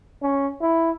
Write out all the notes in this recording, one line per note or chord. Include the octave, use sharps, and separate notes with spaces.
C#4
E4